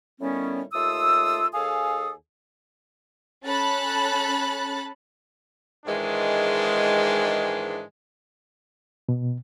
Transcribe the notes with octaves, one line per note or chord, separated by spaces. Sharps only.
A2 D#3 G3 B3 C#4
D#2 A3 F4 D#6 E6
D#2 G#4 A4 F5 G#5 D#6
C#4 A4 A5 B5 F#6 A6
G#2 D#3 E3 G#3 D4
B2